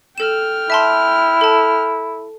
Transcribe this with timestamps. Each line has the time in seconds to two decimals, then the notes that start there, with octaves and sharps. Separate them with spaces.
0.18 A4 G5 F6 E7
0.70 E4 E5 A5 C6
1.41 A4 A5